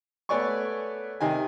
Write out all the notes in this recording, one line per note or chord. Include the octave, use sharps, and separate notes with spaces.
A3 B3 C#5 D5 G#5 C#6
C3 D#3 D#5 G#5